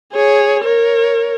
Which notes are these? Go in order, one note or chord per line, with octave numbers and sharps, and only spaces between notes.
G#4 C#5
A#4 C#5